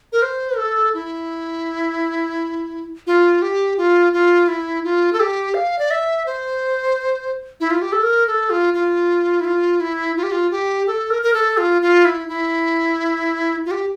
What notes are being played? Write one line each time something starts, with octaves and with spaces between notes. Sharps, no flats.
A#4
C5
A4
E4
F4
G4
F4
F4
E4
F4
A4
G4
F5
D5
E5
C5
E4
F4
G4
A4
A#4
A4
F4
F4
E4
F4
E4
F4
G4
F4
G4
A4
A#4
A#4
A4
F4
F4
E4
E4
F4
G4